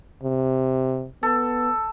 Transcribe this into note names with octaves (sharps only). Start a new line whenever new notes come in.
C3
B3 A4